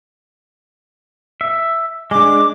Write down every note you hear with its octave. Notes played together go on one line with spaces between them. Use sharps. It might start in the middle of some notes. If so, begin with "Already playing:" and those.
E5
G#3 D4 D6